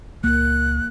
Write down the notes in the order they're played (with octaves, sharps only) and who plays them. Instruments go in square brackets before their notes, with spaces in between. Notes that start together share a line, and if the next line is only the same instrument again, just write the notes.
[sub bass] C#2 [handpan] A#3 [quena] F#6